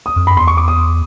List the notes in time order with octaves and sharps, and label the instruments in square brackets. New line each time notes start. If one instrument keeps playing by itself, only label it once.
[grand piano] D#6
[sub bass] F2
[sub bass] F#2 [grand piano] B5
[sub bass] E2 [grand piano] C6
[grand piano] C#6
D6
D#6